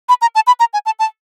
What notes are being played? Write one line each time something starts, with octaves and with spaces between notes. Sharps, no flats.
B5
A#5
A5
B5
A#5
G#5
A5
A5